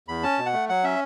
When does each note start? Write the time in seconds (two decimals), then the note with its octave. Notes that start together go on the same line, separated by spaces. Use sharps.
0.08 E2 B5
0.23 C#4 A5
0.39 B2
0.46 F#5
0.53 A3
0.69 F#3 F#5
0.84 C#4 E5